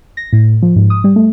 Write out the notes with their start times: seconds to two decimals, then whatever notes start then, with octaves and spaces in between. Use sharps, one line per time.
0.17 A#6
0.33 A2
0.62 F3
0.76 G#2
0.90 D#6
1.04 G3
1.16 A3